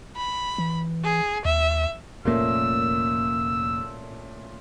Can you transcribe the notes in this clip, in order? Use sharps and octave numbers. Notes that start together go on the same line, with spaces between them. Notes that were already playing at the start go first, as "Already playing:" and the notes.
B5
E3
G#4
D#2 E5
F1 A#2 A3 A#3 C#4 E6